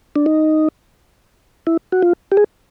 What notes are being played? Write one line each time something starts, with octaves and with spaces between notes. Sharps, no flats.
D4
D#4
E4
F#4
F4
G4
G#4